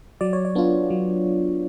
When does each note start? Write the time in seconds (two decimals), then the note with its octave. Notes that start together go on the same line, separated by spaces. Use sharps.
0.21 F#3 D5
0.33 C#5
0.45 D5
0.55 B3 D4 F4
0.90 F#3